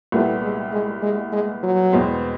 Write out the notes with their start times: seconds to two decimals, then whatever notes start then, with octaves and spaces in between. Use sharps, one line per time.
0.12 C2 A#2 G3 A3 B3 E4
0.43 G#3
0.73 G#3
1.02 G#3
1.32 G#3
1.63 F#3
1.92 E2 B2 G#3 C4